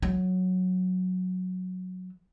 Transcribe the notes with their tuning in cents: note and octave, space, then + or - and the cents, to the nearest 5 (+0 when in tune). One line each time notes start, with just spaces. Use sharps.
F#3 -10